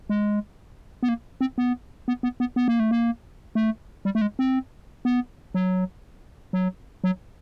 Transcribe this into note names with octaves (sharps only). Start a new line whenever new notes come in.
G#3
B3
A#3
C4
B3
B3
B3
B3
B3
A#3
A3
A#3
A3
G3
A3
G#3
C4
B3
F#3
F#3
F#3